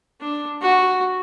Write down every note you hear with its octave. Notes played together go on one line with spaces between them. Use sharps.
D4
F#4